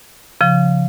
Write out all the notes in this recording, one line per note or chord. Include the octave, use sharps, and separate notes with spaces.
C#3 F3